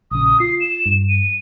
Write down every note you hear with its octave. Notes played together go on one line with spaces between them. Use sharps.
A#1 C#3 D#6
F4 C7
E7
G2
D#7